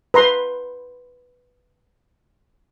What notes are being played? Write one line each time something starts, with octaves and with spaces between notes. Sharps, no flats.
B4 A#5 C6